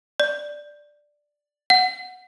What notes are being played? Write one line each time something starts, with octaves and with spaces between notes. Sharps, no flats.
D5
F#5